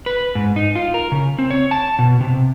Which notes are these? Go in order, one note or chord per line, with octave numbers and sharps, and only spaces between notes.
B4
G#2
D#4
F4
A#4
C#3
C4
C#5
A5
B2
C3